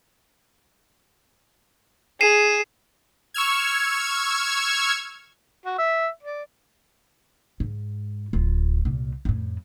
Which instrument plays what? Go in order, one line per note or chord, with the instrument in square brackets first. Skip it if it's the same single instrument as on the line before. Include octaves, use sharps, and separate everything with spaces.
[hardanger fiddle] G#4 [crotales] C7 D#7 E7
[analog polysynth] C#6 E6 F6 G#6
[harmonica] F#4
E5
D5
[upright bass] G#2
D1 F4
C2 A#2
F2 A2